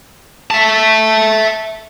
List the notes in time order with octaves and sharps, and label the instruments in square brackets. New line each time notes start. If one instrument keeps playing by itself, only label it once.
[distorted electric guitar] E5 A5